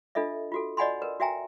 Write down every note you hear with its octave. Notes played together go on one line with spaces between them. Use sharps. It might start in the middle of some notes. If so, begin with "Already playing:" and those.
D4 F4 A4 D#5 E5
F4 F#4 A4
D5 D#5 F#5 G#5 B5 C6
A#4 B4
F#4 E5 G5 G#5 A#5